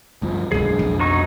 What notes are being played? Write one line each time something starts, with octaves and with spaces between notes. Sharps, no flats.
D2 G2 F3 F#3
B1 F#2 D3 G#3 G#4
F2
F#3 D#4 C#6